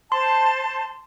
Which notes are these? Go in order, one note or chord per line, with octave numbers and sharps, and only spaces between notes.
C5 A5 C6